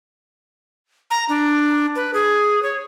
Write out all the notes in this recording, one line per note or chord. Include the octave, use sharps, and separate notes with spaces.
A#5
D4
B4
G#4
C#5